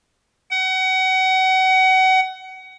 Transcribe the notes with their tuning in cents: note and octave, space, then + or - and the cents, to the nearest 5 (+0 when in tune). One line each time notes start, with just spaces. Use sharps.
F#5 +30